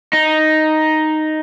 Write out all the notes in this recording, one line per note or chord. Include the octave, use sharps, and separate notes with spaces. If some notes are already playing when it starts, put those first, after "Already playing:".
D#4